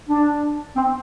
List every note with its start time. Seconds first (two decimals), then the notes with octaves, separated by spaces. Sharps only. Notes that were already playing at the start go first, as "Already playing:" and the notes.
0.09 D4
0.76 C4